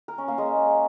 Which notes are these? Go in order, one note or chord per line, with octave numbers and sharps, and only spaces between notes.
A#4
C#4
A#3
G#3